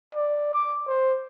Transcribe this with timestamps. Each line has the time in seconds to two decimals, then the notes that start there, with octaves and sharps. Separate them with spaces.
0.15 D5
0.54 D6
0.87 C5